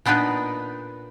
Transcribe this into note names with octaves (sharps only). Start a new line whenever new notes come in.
A#2 B3 D4 D#4 B4